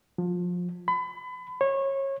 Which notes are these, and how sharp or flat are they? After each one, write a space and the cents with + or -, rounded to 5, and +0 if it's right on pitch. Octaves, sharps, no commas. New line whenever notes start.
F3 +25
B5 +30
C#5 -25